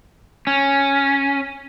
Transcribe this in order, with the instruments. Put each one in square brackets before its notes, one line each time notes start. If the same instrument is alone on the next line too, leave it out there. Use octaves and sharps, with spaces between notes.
[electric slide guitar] C#4